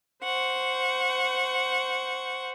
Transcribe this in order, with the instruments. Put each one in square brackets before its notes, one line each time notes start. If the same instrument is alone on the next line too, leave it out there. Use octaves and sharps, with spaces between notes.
[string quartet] C5 F#5 C#6